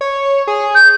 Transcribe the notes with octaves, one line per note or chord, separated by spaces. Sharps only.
C#5
G#4
G6